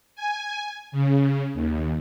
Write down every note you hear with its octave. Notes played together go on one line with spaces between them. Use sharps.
G#5
C#3
D#2